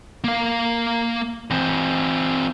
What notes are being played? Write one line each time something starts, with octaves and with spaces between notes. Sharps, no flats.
A#3 F5
E3 C4